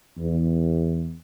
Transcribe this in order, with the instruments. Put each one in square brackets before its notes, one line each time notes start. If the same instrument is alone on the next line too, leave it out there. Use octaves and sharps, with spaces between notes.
[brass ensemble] E2